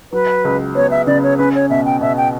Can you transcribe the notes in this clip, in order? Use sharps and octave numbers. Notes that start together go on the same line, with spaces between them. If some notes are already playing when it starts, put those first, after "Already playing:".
F#3 B4
C#2
B3 C#5
E5
C#3 D5
C#5
C#4 B4
C#5
B2 E5
G5
B2 E5
G5